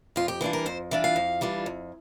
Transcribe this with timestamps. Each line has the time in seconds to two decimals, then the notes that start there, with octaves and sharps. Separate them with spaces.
0.16 F2 F4
0.28 G4
0.41 E3 G3 D4 F4
0.53 A#4
0.66 F2 C5
0.91 E3 G3 D4 F4
1.04 F5
1.16 F2
1.41 E3 G3 D4 F4
1.66 F2